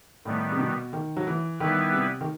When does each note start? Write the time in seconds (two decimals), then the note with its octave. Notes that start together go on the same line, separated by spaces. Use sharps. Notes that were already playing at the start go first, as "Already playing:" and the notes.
0.25 A2 D#3 G3 B3
0.52 C3
0.59 B2
0.93 D#3
1.17 F#3
1.27 E3
1.60 D#3 G3 B3 E4 B4
1.93 C3
2.21 D#3